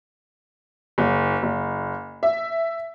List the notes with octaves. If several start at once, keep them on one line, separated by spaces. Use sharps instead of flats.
F#1
F#1
E5